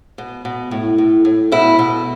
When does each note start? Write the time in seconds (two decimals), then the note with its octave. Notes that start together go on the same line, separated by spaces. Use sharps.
0.18 B2
0.45 B2
0.71 A2
0.98 A2
1.25 A2
1.52 B2 E4
1.79 B2